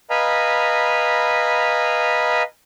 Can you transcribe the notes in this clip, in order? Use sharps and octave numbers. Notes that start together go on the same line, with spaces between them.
B4 D#5 F5 G#5 A#5 B5